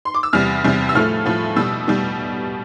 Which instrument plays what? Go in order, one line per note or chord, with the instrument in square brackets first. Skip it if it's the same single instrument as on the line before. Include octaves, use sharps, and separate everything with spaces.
[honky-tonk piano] C6
D6
E6
E2 C3 G3 F6
E2 C3 G3
E6
A2 F3 A3 F6
A2 F3 A3
B2 G3 E6
B2 G3